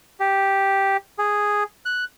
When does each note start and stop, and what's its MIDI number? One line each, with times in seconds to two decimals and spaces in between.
0.20 0.97 67
1.18 1.64 68
1.85 2.04 90